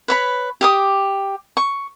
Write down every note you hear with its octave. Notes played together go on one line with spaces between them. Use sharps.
B4 C#5 B5
G4 D6 D#6
C#6